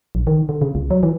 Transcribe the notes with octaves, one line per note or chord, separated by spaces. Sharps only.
A#1
D#3
D3
C#3
C#2
F#3
E3